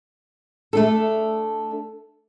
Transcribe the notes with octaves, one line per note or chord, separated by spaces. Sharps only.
A3 D4 A4